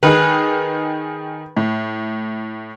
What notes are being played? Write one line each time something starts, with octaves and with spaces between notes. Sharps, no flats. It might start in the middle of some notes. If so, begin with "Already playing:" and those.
D#3 D#4 G#4 B4
A2